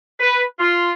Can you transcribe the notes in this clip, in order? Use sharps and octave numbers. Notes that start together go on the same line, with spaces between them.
B4
F4